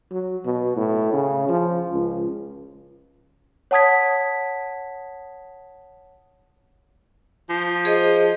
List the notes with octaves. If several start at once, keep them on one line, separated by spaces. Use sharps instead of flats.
F#3
B2
A2
C#3
F3
C#2
C#5 F#5 A5 D#6 G#6 B6
F3
G#4 C5 D#5